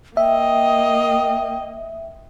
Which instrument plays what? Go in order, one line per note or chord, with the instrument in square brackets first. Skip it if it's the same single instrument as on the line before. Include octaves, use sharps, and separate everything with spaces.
[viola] A#3 D#5 [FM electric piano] E5 [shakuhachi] G5